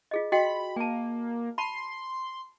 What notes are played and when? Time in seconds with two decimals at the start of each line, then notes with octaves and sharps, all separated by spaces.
0.11 F4 G#4 D#5
0.32 F#4 D#5 G5 B5
0.76 A#3 G#5 A5
1.58 A5 B5 C6